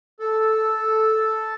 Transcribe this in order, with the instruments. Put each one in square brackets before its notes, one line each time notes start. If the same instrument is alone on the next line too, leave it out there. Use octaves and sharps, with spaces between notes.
[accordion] A4